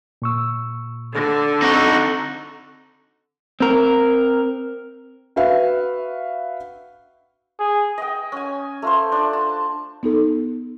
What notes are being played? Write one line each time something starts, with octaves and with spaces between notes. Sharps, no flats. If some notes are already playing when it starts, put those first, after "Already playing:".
A#2 C#6 E6
D3
C4 D#4 F#4
C4 A#4
F#4 B4 E5 F5
G#4
D#5 G5
C#4 G#5
A3 F4 C5
D4
A5
B3 D#4 A4